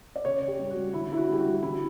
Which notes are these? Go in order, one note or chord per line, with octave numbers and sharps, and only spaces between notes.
D5
C#3 C#5
C#3
G4
G3
F#4
G3
D3 E4
D3 E4
F#4
G3 G4
F#4
G3
F#4
D3 E4